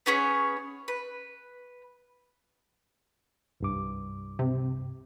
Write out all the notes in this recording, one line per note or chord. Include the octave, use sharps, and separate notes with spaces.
B3 C#4 G#4 C#5
B4
C2 G2 D6
C3